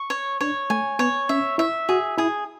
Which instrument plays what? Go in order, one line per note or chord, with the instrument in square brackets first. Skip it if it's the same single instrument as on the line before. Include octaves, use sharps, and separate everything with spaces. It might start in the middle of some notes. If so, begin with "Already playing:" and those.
Already playing: [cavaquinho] C#6
C#5
[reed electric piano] D4 [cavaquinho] C#5
[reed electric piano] A3 [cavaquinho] G#5
[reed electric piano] B3 [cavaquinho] C#5
[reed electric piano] C#4 [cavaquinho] E5
[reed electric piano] E4 [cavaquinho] E5
[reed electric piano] F#4 [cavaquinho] G#4
[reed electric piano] E4 [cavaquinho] G#4